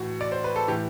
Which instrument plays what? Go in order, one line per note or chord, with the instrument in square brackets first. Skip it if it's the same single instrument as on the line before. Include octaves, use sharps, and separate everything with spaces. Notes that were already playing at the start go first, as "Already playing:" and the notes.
Already playing: [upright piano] A2 E3 F#4
D5
C5
B4
A4
A2 E3 G4